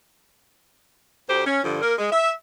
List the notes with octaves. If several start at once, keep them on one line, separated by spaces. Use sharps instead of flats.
D2 G4 C5
C#4
G2 D3 F3
A#3 A#4
G#3
E5